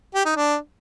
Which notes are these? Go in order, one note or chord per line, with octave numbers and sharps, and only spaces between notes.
G4
D#4
D4